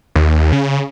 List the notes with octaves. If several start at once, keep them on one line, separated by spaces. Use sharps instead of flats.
D#2
C#3